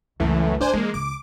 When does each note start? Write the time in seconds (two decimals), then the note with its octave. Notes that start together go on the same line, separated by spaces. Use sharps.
0.20 C#2 F#2 E3 A3
0.61 C#4 D4 C5 G#5
0.73 E3 G#3 A#3
0.94 C#2 D6